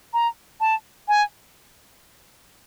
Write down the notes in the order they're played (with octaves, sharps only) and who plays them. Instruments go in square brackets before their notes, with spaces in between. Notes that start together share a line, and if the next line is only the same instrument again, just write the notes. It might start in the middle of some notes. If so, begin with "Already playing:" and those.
[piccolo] A#5
A5
G#5